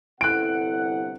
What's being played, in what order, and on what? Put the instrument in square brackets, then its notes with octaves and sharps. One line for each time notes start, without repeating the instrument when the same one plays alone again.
[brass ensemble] G1 C3 F#5 [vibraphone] E4 A4 [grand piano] F#6 D7